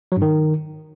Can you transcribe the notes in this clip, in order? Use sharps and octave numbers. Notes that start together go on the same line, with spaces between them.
F#3
G2
D#3